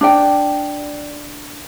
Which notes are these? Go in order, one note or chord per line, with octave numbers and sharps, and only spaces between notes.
D4 D5 G5